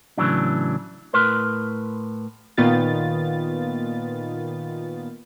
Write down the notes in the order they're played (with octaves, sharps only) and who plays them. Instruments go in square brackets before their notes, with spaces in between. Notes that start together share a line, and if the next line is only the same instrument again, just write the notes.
[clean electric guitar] A2 C#3 E3 F#3 D4
A2 A#4 B4 C6
[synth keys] A#2 D#3 B3 F4 A6